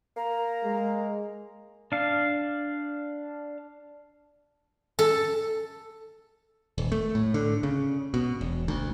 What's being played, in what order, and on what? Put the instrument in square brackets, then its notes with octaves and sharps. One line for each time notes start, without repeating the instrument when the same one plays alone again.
[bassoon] A#3 [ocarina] A#5
[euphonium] G#3
[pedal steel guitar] D4 F5
[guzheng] A4
[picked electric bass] D#1
A3
A2
D3
C#3
B2
E1
D2